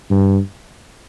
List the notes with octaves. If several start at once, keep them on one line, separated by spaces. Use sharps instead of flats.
G2